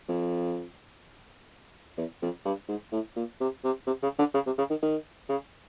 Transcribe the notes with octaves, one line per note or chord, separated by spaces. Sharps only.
F2
E2
F2
G2
G#2
A2
A#2
C3
C3
C3
C#3
D3
C#3
C3
C#3
D#3
D#3
C#3